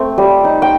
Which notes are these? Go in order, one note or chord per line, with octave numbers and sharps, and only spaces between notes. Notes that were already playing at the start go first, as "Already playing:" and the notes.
Already playing: A3 C4
G3
D#4
G5